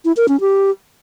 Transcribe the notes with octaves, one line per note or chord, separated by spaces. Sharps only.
E4
A#4
C#4
G4